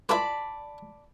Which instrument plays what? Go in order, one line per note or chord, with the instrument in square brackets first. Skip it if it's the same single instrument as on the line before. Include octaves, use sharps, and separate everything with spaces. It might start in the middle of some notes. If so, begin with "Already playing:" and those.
[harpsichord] E4 F4 B4 [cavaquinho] D5 A5 B5